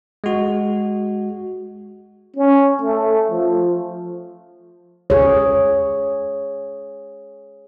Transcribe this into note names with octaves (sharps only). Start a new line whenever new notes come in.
G#3 F#4
C#4
A3
F3
G#4 C#5